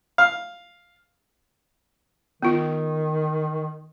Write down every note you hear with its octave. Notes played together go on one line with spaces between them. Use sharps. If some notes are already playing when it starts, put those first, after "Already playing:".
F5
D#3 B3 F4